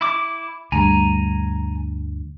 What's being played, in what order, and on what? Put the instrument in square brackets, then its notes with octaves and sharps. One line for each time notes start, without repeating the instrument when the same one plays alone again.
[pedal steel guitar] E4 D6
[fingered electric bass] D2 G2 [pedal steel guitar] G#5 A#5